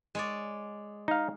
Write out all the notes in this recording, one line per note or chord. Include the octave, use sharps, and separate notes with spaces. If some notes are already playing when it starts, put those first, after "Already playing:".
G#3 C#5 D5
D#4 F5